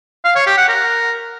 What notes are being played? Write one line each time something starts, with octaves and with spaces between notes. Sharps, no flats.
F5
C#5
G4
F#5
A#4